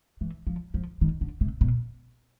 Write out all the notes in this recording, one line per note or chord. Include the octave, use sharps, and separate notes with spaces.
E3
F3
F3
D#3
D3
C3
B2